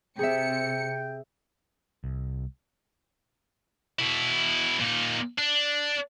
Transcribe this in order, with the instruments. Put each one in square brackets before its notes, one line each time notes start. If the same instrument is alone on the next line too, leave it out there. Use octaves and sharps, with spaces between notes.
[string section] C3 C#7 [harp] G#4 E5 [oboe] G5
[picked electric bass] C2
[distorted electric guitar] B2 E4
A#2 D#4
D4